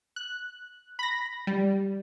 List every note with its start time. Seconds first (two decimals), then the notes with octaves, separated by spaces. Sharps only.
0.16 F#6
0.99 B5 A#6
1.47 G3